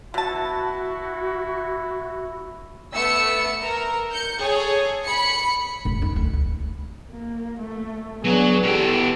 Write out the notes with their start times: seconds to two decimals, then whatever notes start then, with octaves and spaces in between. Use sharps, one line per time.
0.14 B2 E4 F#4 A5
2.94 A3 B3 E6 C#7
3.62 A#4
4.12 G6 C#7
4.41 G#4 A4 C#5
5.06 B5 C#7
5.85 F1
6.02 D#4
6.16 D2
6.33 D2
7.10 A#3
7.59 A3
8.24 F#3 B3 D4 F#4 G#4
8.64 B2 E3 G4 A4 G5